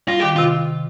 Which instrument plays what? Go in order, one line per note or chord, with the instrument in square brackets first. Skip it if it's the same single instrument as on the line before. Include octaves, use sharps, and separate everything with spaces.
[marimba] G3 [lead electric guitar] F4
[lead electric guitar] G4
[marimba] D#3
[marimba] C3 [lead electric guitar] F4